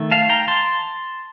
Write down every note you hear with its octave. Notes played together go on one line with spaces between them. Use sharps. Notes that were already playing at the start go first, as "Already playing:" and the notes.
Already playing: D#3 A3
F5 A5
G5 A#5
A5 C6